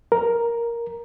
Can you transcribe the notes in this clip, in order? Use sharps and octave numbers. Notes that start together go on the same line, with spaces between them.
A#4